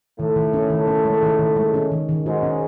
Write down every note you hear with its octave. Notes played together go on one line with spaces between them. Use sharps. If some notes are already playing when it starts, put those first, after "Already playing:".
A2 D#3 A3
D#3
C#4
D#3
C#4
G#3
D#3
D#3
G#3
C#4
D#3
D#3
G#2 G#3 F#4
C#4